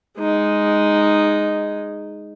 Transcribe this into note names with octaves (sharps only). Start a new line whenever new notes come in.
G#3 D#4